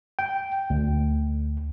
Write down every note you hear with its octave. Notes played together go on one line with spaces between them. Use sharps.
G5
D2